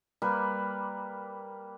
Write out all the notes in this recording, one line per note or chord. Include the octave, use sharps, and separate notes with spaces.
G3 A#3 B4